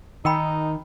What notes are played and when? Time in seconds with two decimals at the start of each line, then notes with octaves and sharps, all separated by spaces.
0.25 D#3 D#4 A#4 G5 B5